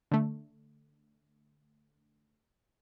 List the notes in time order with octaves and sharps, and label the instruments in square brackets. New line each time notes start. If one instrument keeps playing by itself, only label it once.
[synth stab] D3 A3